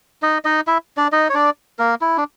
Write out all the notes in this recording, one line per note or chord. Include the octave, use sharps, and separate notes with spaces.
D#4 D#5
D#4 D#5
E4 E5
D4 D5
D#4 D#5
C#5
D4 D5
A#3 A#4
E4
D4